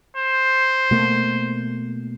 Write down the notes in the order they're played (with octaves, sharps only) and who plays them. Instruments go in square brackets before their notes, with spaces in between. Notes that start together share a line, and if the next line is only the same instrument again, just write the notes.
[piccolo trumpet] C5
[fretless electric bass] B2 A3 A#3